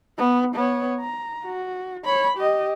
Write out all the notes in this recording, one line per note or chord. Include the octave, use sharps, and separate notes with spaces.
B3
B3 C#5
A#5
F#4
C#5 B5
G4 D#5